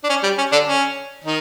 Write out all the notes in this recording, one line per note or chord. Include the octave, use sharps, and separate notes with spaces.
D4
C#4
G3
C#4
D3 D4
C#4
D#3 D#4